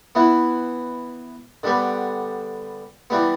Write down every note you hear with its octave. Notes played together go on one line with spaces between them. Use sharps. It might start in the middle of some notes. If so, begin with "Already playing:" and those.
E3 B3 E4
D3 G3 B3
E3 G3 B3